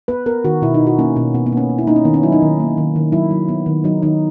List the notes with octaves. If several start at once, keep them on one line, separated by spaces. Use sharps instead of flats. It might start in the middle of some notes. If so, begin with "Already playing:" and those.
B3 B4
B3 A#4
D#3 F#4
B2 E4
D#4
B2
F#4
A#3 C#4
B2 C#4
B2 B3
B3
A#3
C#4
A#3
E4
A#3 D#4
C#4
D#3 B3
C#4
F#3 E4
D#4
D#3
A#3
D#3
D#3
F#3 E4
F#3
B3
D#3
F#3 D#4
D#3 D#4